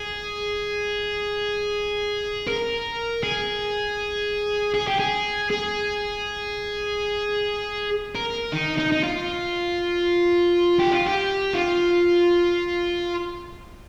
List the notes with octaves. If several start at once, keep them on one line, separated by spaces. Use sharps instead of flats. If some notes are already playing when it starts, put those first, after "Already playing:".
Already playing: G#4
A#4
G#4
G#4
G4
G#4
G#4
A#4
D#4
D#4
D#4
F4
G4
F4
G4
F4